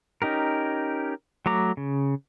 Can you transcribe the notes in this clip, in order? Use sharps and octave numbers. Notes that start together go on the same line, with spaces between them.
C#4 D#4 G4 A#4
F#3 A3 A#5 D6
C#3